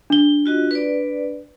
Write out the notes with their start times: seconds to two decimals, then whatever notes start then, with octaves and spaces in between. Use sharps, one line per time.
0.10 D4 G7
0.46 F4 F#4 D#5
0.71 B4 D5